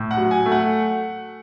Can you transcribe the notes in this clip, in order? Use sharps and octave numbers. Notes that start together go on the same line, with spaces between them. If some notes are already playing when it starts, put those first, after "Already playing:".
Already playing: A2
F#5
F#3
G#5
A3
F#5